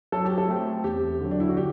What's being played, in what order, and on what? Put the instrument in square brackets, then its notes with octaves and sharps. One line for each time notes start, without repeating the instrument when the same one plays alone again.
[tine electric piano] F#3 [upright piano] A4
[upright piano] G4
A4
[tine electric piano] A3 C4
[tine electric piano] E2 [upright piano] G4
[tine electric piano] D3 F#3
[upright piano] D4
E4
F#4
G4